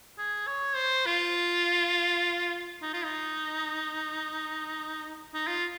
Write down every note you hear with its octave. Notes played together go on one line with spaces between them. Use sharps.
G#4
C#5
C5
F4
D#4
F4
D#4
D#4
F4